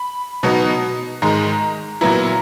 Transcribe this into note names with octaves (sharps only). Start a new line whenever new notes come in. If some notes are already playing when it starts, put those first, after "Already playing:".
Already playing: B5
B2 F#3 B3 D#4
G#2 D#3 G#3 A#5
A#2 F#3 B3 E4 A#5